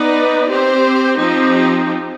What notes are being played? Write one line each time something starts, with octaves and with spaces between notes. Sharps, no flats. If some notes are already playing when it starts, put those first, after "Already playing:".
Already playing: B3 D#4 B4 D5
C4 G4 C5
F3 C4 D#4 G4